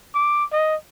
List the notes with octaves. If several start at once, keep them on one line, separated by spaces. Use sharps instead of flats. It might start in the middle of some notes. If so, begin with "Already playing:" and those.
D6
D#5